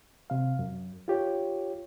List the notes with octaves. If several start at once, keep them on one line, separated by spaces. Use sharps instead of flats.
C3 F5
F#2
F4 G4 C#5